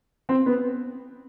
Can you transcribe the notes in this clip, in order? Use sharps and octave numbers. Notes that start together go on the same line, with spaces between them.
C4
B3